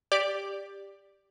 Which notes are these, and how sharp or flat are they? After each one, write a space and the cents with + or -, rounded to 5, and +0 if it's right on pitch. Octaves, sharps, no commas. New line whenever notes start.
G4 +10 D5 +0 D6 +10